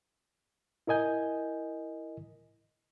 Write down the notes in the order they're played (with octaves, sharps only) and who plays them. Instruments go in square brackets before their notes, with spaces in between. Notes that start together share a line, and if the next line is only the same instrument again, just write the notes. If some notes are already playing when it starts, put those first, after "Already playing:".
[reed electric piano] E4 A#4 D#5 G#5 G6